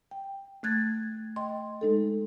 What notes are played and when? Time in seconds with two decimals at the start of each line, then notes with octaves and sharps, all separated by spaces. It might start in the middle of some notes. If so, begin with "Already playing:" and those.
0.11 G5
0.63 A3 F#6 G#6 A6
1.36 D#5 G5 C6
1.81 G#3 D#4 A4